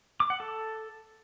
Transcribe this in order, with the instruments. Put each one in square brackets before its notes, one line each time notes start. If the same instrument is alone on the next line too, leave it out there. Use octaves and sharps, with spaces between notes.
[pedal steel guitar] D6
F#5
A4